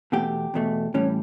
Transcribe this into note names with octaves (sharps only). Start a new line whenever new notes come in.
E2 B2 A3 G4
E2 B2 A3
A2 E3 G3 C#4